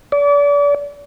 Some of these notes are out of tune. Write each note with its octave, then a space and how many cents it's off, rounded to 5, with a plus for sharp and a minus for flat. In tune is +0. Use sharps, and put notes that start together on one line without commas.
D5 -35